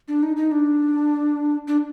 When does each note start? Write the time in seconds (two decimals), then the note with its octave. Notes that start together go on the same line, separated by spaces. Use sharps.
0.08 D4
0.23 D#4
0.37 D#4
0.51 D4
1.68 D4